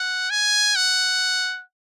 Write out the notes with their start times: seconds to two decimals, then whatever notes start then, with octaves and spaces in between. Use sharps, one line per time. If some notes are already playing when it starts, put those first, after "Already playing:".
Already playing: F#5
0.30 G#5
0.76 F#5